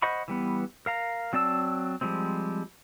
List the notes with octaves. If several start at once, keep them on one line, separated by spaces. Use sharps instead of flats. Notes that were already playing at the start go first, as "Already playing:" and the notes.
C5 D#5 F#5 B5 C#6
E3 G3 B3
A#4 F5 A#5
F#3 C4 D5 A5 E6
F3 G3 G#3 C4